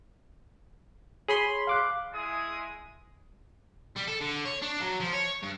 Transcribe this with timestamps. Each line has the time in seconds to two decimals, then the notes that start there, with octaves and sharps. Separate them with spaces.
1.28 G#4 C#5 B5 C6
1.67 F5 D6 F#6
2.12 G#3 E4 G#4 D#6
3.96 G3
4.08 A4
4.21 D3
4.45 C#5
4.62 D4
4.80 F#3
5.00 F3
5.13 C#5
5.43 G2